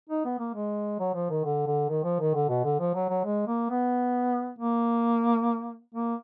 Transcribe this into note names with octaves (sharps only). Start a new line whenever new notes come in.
D#4
B3
A#3
G#3
F#3
F3
D#3
D3
D3
D#3
F3
D#3
D3
B2
D3
F3
F#3
F#3
G#3
A#3
B3
A#3
A#3